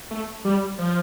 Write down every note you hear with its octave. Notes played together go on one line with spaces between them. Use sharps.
A3
G3
F3